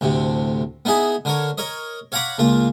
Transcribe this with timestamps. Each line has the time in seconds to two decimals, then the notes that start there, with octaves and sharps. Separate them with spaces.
0.01 D2 A2 C3
0.85 B3 D#4 E4 G#4 G#5
1.25 D3 A#4 C#5
1.58 A#4 C#5 D#5
2.12 C#5 F5 F#5 A#5 B5 D6
2.39 C#2 A#3 F4